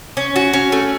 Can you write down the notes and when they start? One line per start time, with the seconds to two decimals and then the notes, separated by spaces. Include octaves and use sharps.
0.17 C#4
0.36 F#4
0.53 C#4
0.72 A3